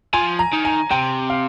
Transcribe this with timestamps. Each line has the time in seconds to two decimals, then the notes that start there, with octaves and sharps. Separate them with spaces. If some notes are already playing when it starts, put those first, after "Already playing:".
0.13 F3 G#5
0.39 A#5
0.53 D#3
0.65 G#5
0.91 C3 G5
1.30 F5